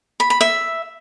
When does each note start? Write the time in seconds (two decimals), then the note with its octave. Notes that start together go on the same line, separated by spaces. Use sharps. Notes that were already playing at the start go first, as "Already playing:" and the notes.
0.20 B5
0.30 B5
0.41 E5